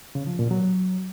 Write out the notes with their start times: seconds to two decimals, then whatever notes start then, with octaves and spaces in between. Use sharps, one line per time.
0.15 C#3
0.27 F3
0.39 A#2
0.51 F#3